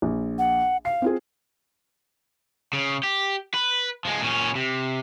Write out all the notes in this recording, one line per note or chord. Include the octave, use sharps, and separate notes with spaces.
A#1
F#5
F5 C7
C4 F4 G#4
C#3
G4
B4
F3 G#3
A#2 C#4
C3